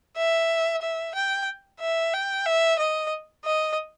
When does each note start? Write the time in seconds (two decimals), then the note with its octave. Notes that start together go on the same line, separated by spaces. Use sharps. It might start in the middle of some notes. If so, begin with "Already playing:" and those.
0.17 E5
0.82 E5
1.15 G5
1.81 E5
2.13 G5
2.46 E5
2.79 D#5
3.45 D#5